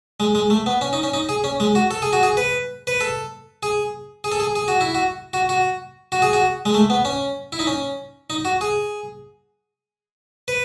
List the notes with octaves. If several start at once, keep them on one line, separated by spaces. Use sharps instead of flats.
G#3
G#3
A3
B3
C#4
D#4
C#4
D#4
G#4
C#4
G#3
F#4
A4
G#4
F#4
G#4
B4
B4
A4
G#4
G#4
A4
G#4
G#4
F#4
E4
F#4
F#4
F#4
F#4
G#4
F#4
G#3
A3
B3
C#4
E4
D#4
C#4
D#4
F#4
G#4
B4